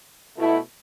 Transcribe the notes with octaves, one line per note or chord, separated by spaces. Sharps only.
B2 A3 E4